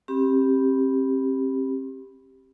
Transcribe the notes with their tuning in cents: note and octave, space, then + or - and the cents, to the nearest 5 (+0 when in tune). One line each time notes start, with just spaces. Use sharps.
C4 +35 G4 +0 B5 +0